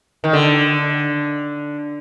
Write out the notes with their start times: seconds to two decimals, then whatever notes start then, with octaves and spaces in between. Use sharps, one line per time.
0.24 D#3
0.33 D3